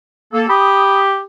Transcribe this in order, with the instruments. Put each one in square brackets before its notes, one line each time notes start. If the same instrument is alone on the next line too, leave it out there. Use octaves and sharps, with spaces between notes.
[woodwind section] A#3 A4
[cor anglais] G4 [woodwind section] B5 D#6